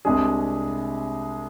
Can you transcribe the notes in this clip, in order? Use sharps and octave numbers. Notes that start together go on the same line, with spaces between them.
C2 C3 G#3 D4 G#4